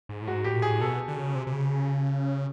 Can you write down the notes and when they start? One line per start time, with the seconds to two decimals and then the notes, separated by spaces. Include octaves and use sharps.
0.09 G#2
0.22 A2
0.27 G#2 F#4
0.44 A2 G4
0.56 A#2
0.62 A2 G#4
0.81 B2 A4
1.08 D3
1.16 C#3
1.35 C3
1.47 C3
1.53 C#3